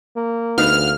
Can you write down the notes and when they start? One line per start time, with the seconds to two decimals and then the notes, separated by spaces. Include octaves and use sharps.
0.16 A#3
0.58 D2 B3 D#4 F5 F6